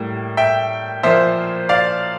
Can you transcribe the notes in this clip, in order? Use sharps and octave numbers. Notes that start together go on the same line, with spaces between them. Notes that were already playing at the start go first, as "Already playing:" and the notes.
Already playing: A2 G3 A#3
E5 G5
A#2 F3 A#3 C5 E5
D5 F5